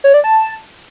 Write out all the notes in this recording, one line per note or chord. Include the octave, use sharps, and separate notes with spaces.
C#5
D5
A5